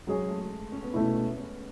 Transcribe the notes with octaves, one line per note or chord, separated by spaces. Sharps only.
F#3 G#3 C#4 G#4 C#5
A3
C#4
B3
B2 A3 C#4 E4
C#4
C#4